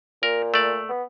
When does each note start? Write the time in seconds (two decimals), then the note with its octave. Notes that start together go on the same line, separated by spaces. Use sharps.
0.23 A#2 A#4
0.54 A3 D5
0.89 B3